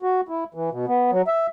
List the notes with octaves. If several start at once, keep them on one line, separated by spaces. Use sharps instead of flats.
F#4
E4
E3
B2
B3
F#3
E5